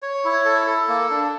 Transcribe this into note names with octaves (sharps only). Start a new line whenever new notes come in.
C#5
E4
A4
A4
A#3
D4